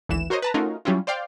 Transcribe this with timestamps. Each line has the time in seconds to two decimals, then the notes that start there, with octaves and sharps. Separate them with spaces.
0.09 G#1 D2 E3 E7
0.30 F#4 A#4 C5 C#5 D#5
0.42 B4 A5 A#5
0.54 A3 C#4 D#4 F4 F#4 A#4
0.85 F#3 G3 C#4 E4 F4
1.07 C5 D5 F5 G5